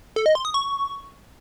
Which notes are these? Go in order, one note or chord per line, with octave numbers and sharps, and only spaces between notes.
A4
D#5
C6
D#6
C#6